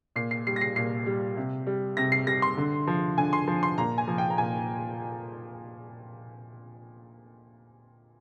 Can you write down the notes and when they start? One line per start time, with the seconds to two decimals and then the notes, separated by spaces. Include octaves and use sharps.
0.16 A#2 C7
0.31 C7
0.47 G3 C7
0.56 A#6
0.61 C7
0.76 A#2 C7
1.06 G3
1.37 C3
1.67 G3
1.97 C3 A#6
2.12 C7
2.27 G3 A#6
2.42 C6
2.57 D3
2.87 F3
3.18 D3 G#5
3.33 C6
3.48 F3
3.63 C6
3.78 A#2 A#5
3.98 G#5
4.08 F3
4.18 G5
4.30 A#5
4.38 A#2 G#5